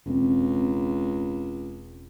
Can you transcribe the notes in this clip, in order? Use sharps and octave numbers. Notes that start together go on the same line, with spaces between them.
E1 C#2 C4